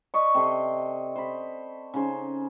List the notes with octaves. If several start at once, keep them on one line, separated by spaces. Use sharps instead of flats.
B4 D5 D#5 C#6
C3 A4 C6
C5 B5
C#3 D#4 G#4 C5